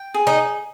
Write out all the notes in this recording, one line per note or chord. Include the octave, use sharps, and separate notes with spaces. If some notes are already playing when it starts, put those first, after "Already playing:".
Already playing: G5
G#4
D#4